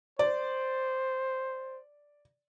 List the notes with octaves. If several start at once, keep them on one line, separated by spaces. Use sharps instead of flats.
C5 D5